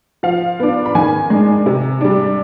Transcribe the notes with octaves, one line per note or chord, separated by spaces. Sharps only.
F3 F5
B3 D4
B5
D#3 G#5
G#3 D4
C3
G3 D4